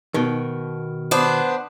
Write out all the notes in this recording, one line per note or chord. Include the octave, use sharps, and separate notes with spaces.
B2 D#3
B3 D4 C5